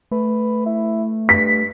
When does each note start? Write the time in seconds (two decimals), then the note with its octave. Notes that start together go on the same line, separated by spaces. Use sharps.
0.11 A3 B4
0.66 E4
1.29 G2 B6